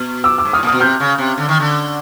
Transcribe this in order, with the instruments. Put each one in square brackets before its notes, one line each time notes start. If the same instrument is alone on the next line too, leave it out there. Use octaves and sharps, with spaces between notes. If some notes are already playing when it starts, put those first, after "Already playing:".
Already playing: [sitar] B2
[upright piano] D6 E6
D6 E6
[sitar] G#2
[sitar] A2 [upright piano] D#6 F6
[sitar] A#2
[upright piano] D#6 F6
[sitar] B2
[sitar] C3 [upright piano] F6 G6
[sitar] C#3
C3
D3
D#3
D3